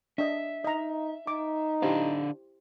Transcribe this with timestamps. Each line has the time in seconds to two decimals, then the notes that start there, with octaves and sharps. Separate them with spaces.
0.18 D4 D#5 E5
0.64 D#4 D#5 A#5
1.27 D#4 D6
1.82 D3 D4 E4 G4 C5 F5